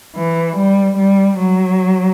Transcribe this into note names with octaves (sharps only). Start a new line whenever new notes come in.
E3
G3
G3
F#3